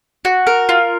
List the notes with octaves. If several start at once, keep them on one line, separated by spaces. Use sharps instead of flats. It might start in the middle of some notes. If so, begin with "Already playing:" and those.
F#4
A#4
F4